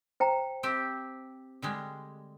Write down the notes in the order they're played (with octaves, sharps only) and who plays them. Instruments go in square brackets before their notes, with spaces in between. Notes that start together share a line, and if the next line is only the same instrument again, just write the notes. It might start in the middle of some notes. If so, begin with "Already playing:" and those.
[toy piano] C5 G5 A#5
[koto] C4 G4 E5
D3 G3 G#3